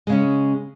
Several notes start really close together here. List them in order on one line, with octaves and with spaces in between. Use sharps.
G#3 C#3 C#4